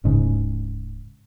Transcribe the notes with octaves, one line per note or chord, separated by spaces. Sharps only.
D1 G#2 C#3